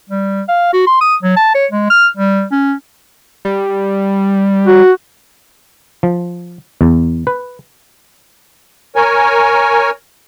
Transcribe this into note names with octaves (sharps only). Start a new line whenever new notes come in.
G3
F5
F#4
C6
D#6
F#3
A5
C#5
G#3
F6
G3
C#4
G3
F#4
F3
E2
B4
A#4 C#5 G#5